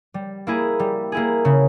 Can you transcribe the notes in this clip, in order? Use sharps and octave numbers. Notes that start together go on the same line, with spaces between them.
G3
A#3 E4 G#4
G3
A#3 E4 G#4
C#3